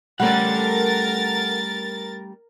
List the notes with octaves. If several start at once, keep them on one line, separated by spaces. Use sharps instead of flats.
G3 A3 C#4 A4 A#4 F#5 A6